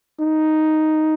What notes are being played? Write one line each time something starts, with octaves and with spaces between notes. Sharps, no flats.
D#4